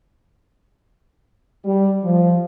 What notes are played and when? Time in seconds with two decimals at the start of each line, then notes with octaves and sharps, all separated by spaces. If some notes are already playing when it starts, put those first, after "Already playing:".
1.65 G3
2.04 F3